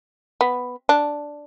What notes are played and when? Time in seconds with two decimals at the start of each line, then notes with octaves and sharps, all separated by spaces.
0.41 B3
0.89 D4